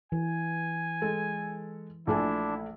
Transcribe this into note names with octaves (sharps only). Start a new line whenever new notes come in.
E3 G#5
G#3 A4
A#1 A3 D4 E4 G#5